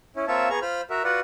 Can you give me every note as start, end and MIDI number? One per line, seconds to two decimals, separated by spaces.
0.16 0.25 61
0.16 0.25 64
0.28 0.49 58
0.28 0.49 60
0.28 0.49 65
0.28 0.49 73
0.28 0.49 76
0.28 0.49 81
0.50 0.59 59
0.50 0.59 68
0.50 0.59 82
0.50 0.59 85
0.62 0.81 65
0.62 0.81 72
0.62 0.81 83
0.62 0.81 89
0.90 1.03 66
0.90 1.03 70
0.90 1.03 76
1.04 1.20 65
1.04 1.20 66
1.04 1.20 71
1.04 1.20 74
1.04 1.20 78